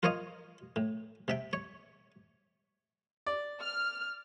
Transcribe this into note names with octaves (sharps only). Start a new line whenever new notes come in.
F4 A#4 C5 C#5 D#5 F5
A2
C3 E5 G5
C#5
D5
F6